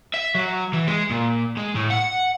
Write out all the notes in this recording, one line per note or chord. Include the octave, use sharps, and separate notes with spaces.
E5
F#3
E3
G#3
A#2
G#3
A2
F#5